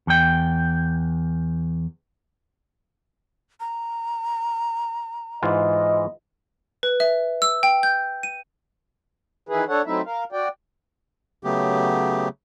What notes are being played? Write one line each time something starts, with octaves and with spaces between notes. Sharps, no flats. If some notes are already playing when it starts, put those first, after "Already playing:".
E2 G5
A#5
G#2 E3 F4 D#5
B4
E5
E6
G5
G6
D#7
D#3 E3 E4 G#4 B4
D4 A4 C#5 F#5
F#3 A3 C4 D#4 E4 E5
A#4 F5
F#4 D5 G5
C#3 F#3 A3 B3 G4